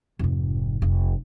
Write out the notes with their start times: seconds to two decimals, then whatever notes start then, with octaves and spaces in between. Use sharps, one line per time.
0.19 F1 G#2
0.82 F1